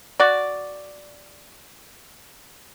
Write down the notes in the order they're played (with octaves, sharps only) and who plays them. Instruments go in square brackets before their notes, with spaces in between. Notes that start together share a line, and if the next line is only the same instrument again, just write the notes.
[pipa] F#4 D5